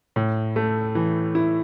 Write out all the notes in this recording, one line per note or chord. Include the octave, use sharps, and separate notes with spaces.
A2
A3
E3
E4